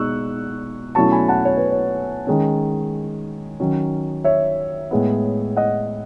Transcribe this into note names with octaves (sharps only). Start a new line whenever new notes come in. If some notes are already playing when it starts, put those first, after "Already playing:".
Already playing: B2 G#3 D#4 C#6 E6 F#6
B2 F#3 A3 C#4 E4 A5 C#6
G#5 B5
F#5 A5
C#5
B4
C#5
D#3 G#3 C#4
D#3 F#3 C#4
C#5 E5
A2 G#3 B3
D#5 F#5